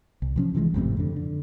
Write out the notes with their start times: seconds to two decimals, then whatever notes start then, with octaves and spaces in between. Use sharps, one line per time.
0.22 C2
0.36 C3 F3 C#4
0.55 C3 E3 F3 G#3
0.74 G#1 F2 A2 C3
0.97 F2 D3
1.16 D3